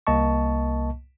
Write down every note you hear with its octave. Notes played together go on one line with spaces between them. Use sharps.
C2 A#3 D#5 A5 C#6